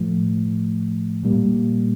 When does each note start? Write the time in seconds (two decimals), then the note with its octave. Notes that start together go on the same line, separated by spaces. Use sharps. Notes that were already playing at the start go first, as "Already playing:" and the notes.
Already playing: A2 F3 A3
1.23 A#2 G3 A#3